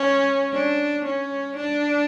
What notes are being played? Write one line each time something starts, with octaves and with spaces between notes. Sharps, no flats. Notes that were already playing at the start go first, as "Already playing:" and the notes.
Already playing: C#4
D4
C#4
D4